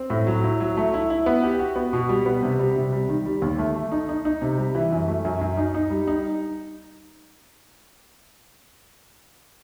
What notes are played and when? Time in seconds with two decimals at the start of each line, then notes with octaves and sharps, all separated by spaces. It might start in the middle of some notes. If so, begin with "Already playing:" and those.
Already playing: C4
0.10 A2
0.27 F#3
0.44 E4
0.60 F#3
0.77 A3
0.94 E4
1.10 E4
1.26 B3
1.43 G4
1.59 F#4
1.76 B3
1.93 B2
2.09 G3
2.26 B3
2.43 C3
2.59 G3
2.76 C3
2.92 G3
3.09 D#3
3.26 G3
3.42 D#2
3.58 A3
3.76 A3
3.92 D#4
4.09 D#4
4.25 D#4
4.42 C3
4.58 G3
4.75 E3
4.92 F#2
5.08 A3
5.25 F#2
5.41 F#2
5.57 D#4
5.75 D#4
5.90 G3
6.08 D#4